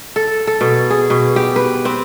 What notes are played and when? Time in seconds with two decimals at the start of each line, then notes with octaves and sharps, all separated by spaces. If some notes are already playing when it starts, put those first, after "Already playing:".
0.16 A4
0.47 A4
0.61 B2
0.90 G#4
1.10 B2
1.36 G4
1.56 B4
1.85 C4